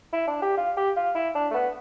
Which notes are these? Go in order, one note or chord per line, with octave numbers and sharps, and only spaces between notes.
E4
D4
G4
F4
G4
F4
E4
D4
A3
B3